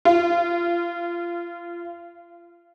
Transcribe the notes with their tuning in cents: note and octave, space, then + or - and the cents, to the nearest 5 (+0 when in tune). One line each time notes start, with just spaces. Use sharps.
F4 -25